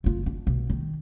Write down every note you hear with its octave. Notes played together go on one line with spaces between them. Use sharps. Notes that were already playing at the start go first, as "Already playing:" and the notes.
F#1 F4
D4
B1
D#3